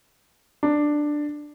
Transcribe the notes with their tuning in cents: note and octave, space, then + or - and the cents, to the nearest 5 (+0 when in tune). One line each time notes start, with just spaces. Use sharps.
D4 +10